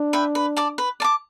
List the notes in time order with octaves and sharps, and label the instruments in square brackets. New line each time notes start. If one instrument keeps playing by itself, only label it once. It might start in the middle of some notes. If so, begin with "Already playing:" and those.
Already playing: [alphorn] D4
[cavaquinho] B4 E5 G5
B4
D5 A5 D6
B4
D5 A5 D6